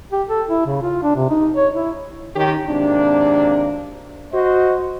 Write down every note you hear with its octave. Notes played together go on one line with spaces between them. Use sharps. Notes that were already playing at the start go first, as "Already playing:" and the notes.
G4
A4
E4
C#3
F4
D4
C3
D#4
C#5
E4
D#3 C#4 G4
G#1 C3 A#3 D4
F#4 C5 D#5